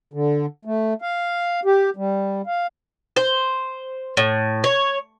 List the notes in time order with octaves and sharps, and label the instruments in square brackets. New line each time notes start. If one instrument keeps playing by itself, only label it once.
[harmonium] D3
A3
F5
G4
G3
F5
[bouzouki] C5
A2
C#5